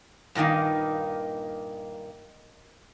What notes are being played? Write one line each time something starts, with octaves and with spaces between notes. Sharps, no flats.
G2 A#2 D#3 A#3 D#4